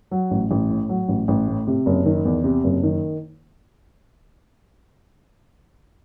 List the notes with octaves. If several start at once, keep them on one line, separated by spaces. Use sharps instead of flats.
F#3
A1
A1
A2
F#3
A1
A1
A2
C3
F#1
D#3
E2
C3
F#1
D#3